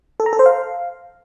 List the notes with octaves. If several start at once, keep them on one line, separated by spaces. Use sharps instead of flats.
A4
A#5
A4
C5
F5